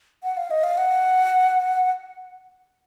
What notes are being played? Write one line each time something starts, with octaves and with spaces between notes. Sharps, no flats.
F#5
F5
D#5
F5
F#5